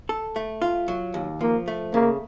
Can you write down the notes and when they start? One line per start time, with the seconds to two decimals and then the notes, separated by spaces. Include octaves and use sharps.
0.09 A4
0.36 A3
0.62 F4
0.88 F#3
1.14 D#2
1.41 F3 A#3
1.68 A3
1.94 C#3 A#3